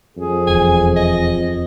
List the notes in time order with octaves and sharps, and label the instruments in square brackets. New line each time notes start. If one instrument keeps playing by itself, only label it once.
[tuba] F2 [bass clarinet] G#4
[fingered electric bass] E1 E2 [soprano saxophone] G#5
[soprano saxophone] D#5